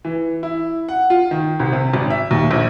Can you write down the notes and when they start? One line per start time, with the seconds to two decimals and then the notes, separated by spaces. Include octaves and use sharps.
0.05 E3
0.43 E4
0.89 F#5
1.10 F4
1.31 D#3
1.59 C2
1.72 C3
1.94 G#1
2.10 E5
2.31 D#2
2.51 A#1